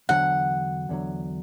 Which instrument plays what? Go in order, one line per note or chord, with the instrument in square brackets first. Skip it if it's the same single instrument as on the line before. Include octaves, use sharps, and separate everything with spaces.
[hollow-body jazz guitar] E2 D3 F#3 [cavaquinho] F#5
[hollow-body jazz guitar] E2 D3 F#3